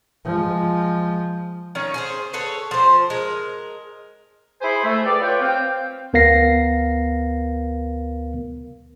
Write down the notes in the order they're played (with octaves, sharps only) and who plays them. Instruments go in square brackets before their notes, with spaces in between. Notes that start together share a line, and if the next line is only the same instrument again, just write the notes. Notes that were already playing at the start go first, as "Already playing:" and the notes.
[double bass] F3 G#3
[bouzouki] D#3 A3 C#4
G#4 A4 C5
G#4 A4 B4 C#5
F3 C5
G#3 A#4
[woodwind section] E4 G#4 C5 G#5 B5 C6
A3
G4 G#4 B4 D5
F4 B4 C#5 G5
C4 F5 G5
[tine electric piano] D2 B3 A#4 F5 A#6 C7